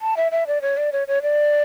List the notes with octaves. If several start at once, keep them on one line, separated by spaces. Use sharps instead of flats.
A5
E5
E5
D5
C#5
D5
C#5
C#5
D5